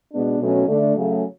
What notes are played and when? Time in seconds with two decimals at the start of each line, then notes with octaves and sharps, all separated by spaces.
0.10 B2 G#3 B3 D4
0.39 B2 F#3 A3 C#4
0.67 D3 A3 D4
0.96 C#3 F#3 A3